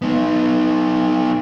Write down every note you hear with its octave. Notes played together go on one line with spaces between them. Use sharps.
B3 D#4